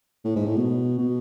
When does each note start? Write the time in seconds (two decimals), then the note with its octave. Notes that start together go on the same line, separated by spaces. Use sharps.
0.25 A2
0.36 G#2
0.46 A2
0.56 B2
0.98 B2